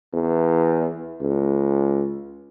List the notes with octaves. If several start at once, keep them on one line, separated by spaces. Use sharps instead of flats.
E2
C#2